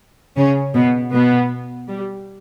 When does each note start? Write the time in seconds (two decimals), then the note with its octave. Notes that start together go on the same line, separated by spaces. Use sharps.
0.37 C#3 C#4
0.74 B2 B3
1.12 B2 B3
1.88 G3